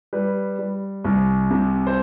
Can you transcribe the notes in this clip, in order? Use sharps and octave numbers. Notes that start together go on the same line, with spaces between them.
G3 B4
G3
C2
C3
C5